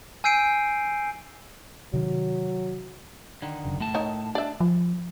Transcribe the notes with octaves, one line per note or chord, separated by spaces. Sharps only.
G#5 E6 G6 C7 D7 D#7
C3 D#3 F#3
D3 D#3
F#1 F#2 C#3
A2 A3 A5
D#4 A#4 C#5
D4 D5 E5
F3